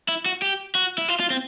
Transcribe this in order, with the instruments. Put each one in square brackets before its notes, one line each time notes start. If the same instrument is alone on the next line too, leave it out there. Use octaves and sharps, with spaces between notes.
[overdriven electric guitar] E4
F#4
G4
F#4
E4
F4
F4
C4